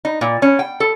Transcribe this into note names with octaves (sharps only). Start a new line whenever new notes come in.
D#4
A#2
C#4
G5
A4